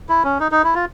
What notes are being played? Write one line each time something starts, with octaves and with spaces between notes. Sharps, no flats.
E4
C#4
D#4
D#4
E4
F4